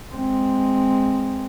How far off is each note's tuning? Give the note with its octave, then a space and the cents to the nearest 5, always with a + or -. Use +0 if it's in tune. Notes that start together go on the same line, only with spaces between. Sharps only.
G#3 +0 C4 +0